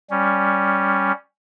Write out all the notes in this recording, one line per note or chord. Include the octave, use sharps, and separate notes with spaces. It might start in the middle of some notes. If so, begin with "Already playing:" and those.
G3 C#4